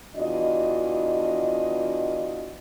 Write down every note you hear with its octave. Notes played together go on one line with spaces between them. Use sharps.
E2 D4 F4 F#4 D#5